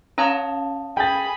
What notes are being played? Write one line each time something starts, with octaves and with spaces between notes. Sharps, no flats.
C#4 C#5 F5 A5 A#5 D#6
G#4 G5 G#5 B5 A6